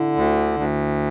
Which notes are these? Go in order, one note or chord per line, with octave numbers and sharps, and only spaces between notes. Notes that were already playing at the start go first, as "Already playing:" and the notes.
Already playing: D3 E4
D2
D2